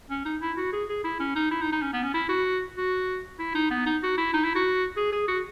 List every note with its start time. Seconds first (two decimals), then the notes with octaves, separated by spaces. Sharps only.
0.10 C#4
0.25 D#4
0.41 E4
0.57 F#4
0.73 G#4
0.89 G#4
1.04 E4
1.20 C#4
1.36 D#4
1.51 E4
1.62 D#4
1.72 D#4
1.82 C#4
1.93 B3
2.03 C#4
2.14 E4
2.29 F#4
2.77 F#4
3.39 E4
3.55 D#4
3.70 B3
3.86 D#4
4.03 F#4
4.18 E4
4.34 D#4
4.44 E4
4.55 F#4
4.97 G#4
5.12 G#4
5.28 F#4